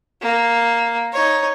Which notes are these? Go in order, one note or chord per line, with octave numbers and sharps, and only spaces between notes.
A#3
D#4 C#5